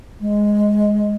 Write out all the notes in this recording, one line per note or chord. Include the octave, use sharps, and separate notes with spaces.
G#3